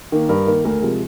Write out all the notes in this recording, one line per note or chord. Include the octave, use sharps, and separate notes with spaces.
D#3 A#3
G2 A#4
D#3 A#3
D2 A#4
C3 F3 G#3